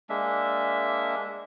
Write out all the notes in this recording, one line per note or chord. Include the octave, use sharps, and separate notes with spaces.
G#3 A#3 D4 E5